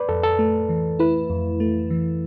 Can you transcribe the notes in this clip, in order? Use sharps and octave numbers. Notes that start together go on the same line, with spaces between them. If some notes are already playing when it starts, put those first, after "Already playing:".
Already playing: B4 D5
F2 A4
A4
A3
E3
E4 B4
F2
A3
E3